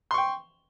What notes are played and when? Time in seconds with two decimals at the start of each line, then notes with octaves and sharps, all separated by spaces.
0.11 C6
0.14 C#6
0.18 G5